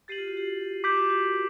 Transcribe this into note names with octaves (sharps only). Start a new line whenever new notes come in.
G4 A6 C7 D#7 F#7
F4
F#4
G4
G4 D6 G6 B6 D7 F#7
F4
F#4
F#4
A#4